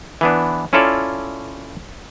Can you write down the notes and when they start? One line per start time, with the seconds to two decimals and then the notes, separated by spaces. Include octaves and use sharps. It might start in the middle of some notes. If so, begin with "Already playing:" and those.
0.21 E3 B3 D4
0.73 C#4 E4 F4 A4 C#5 D5